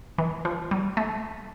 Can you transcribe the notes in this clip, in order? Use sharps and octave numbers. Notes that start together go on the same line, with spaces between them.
E3
F3
G3
A3